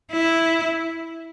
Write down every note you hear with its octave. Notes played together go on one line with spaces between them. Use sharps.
E4